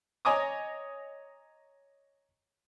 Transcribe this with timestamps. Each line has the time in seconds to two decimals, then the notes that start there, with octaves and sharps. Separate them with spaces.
0.25 C#5 D#5 G#5 A#5 D6 D#6